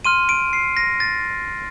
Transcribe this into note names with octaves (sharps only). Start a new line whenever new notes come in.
C6 F6 D#7
D7
C7
A#6
A6